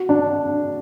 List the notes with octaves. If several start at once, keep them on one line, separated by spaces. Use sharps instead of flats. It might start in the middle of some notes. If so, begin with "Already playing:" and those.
Already playing: F#4
D4